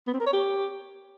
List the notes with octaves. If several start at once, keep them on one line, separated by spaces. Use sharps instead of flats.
B3
C4
A#4
C#5
G4